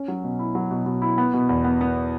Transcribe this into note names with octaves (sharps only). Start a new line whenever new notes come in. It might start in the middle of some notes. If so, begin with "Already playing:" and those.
Already playing: C#4
F#3
B2
E4
F#3
B2
B2
E4
B3
B2
E2
B3
B3